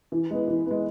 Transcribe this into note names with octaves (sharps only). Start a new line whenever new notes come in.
E3
G#3 B3
E3
G#3 B3